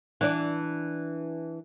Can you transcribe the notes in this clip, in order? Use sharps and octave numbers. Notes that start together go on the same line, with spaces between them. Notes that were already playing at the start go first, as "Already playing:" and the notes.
E3 D4